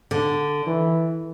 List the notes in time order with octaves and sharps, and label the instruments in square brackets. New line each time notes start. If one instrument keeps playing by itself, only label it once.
[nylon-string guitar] D3
[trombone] E3